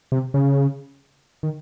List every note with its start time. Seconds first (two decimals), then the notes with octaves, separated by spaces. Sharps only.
0.12 C3
0.34 C#3
1.43 D#3